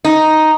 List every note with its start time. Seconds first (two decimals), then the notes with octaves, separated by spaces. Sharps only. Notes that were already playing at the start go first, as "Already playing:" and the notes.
0.05 D#4